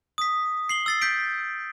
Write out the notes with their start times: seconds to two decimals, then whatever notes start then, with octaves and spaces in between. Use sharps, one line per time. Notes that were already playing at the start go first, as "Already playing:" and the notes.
0.18 D#6 B6
0.69 C7 F#7 G7
0.86 E6 A6 C7
1.01 G6 B6 D7